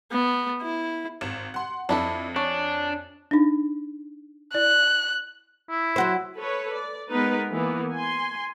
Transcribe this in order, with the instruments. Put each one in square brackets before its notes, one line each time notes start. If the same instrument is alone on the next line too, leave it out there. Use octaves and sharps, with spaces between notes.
[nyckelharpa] B3
E4
[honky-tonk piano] G#1 E7
F#5 C6
[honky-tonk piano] F2 [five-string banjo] D4 E4 A4
[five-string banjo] C#4 [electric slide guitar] D4
[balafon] D4 D#4
[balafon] E4 D5 [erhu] F#6
[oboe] E4
[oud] F#3 F#4 C5
[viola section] A4 B4 C#5
D5
G#3 B3 D#4 A#4 B4
E3 A#3 B3
G#5 C6